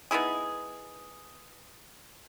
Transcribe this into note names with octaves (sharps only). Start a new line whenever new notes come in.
B3 D#4 E4 G#4